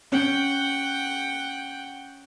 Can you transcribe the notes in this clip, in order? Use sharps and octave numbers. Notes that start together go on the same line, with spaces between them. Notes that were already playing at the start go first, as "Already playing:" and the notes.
C#4 F#5 G5